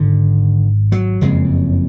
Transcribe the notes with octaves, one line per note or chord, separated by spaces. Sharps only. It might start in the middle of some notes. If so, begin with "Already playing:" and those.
Already playing: G#1 G#2 D3
F#3
F#1 F2 C#3 G#3